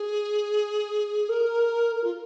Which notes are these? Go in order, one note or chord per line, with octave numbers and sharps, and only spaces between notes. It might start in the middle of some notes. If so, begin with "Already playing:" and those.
Already playing: G#4
A#4
A#4
F4